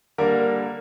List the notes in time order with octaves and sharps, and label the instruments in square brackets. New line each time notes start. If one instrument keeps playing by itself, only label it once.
[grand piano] D3 G3 A#3 A#4